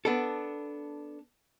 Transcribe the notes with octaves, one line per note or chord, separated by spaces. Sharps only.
B3 D4 A4